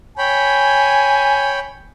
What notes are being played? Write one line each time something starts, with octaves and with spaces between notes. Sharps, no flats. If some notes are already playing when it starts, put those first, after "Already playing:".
C#5 G5 G#5 B5